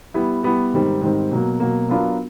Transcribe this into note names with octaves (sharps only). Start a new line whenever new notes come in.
G3 B3 E4
G3 B3 E4
G#2 D#3 G3 C4
G#2 D#3 G3 C4
B2 F#3 A#3
B2 F#3 A#3
F#3 B3 D4 F4 A#4